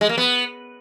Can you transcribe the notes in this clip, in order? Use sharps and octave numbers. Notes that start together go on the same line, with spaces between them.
G#3
A#3
B3